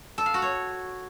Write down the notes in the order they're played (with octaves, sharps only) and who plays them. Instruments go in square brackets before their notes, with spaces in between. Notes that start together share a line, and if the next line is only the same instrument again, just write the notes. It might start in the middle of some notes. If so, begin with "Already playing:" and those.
[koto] A4
F5
F#4
C#5